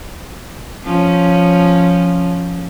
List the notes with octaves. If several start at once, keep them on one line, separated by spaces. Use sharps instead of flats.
F3 C#4